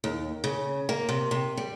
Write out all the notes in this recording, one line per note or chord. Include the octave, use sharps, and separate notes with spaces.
D#2
C#3
A#3
C3
C3
G3